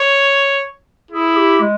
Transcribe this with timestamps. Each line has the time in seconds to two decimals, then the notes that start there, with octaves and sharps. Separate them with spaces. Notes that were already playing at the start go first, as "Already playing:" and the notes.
Already playing: C#5
1.11 E4 G#4
1.37 G4
1.61 G#3